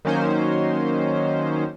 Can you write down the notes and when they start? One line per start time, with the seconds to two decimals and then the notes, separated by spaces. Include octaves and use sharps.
0.05 D#3 F#3 A#3 C#4 D#4 C5